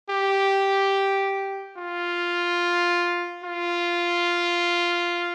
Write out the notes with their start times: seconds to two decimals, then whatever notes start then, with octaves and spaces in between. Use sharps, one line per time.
0.10 G4
1.77 F4
3.44 F4